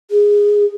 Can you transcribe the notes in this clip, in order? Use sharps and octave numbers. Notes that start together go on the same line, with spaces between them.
G#4